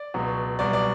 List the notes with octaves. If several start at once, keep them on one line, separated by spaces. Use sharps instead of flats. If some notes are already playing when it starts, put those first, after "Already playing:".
Already playing: D5
C#2 B2 F#3
C2 B2 F#3 D5
D5